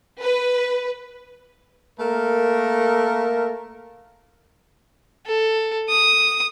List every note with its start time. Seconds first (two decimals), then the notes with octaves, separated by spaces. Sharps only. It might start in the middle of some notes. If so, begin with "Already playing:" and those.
0.21 B4
1.99 A3 A#3 A4 A#4
5.26 A4
5.89 D#6